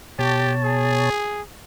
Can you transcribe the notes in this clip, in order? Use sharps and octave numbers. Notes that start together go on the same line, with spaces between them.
B2 G4 C#5 A5
G#4